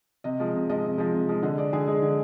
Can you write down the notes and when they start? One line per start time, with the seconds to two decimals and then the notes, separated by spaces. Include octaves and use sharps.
0.24 C3 D#5
0.40 F3 G#3
0.55 C3
0.69 F3 G#3 D#5
0.84 C3
0.98 F3 G#3
1.14 C3
1.29 F3 G#3
1.43 D3 D#5
1.58 G#3 D5
1.73 D3 G#4
1.88 G#3
2.02 D3